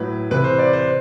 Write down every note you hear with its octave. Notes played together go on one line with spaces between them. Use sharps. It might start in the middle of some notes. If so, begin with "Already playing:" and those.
Already playing: A2 F#3 B4
C3 E3 B4
C5
D5
C5